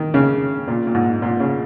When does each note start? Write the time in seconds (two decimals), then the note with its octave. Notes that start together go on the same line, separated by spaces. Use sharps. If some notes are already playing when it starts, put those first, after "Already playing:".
Already playing: D#3
0.14 C#3
0.68 A#2
0.87 A#2
0.95 G#2
1.22 A#2
1.40 C#3